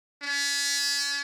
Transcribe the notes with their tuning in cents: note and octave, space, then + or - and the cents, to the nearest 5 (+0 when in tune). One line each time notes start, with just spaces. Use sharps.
C#4 +40